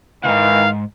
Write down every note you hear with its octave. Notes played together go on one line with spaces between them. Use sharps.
C#2 G#2 D#3 E3 F5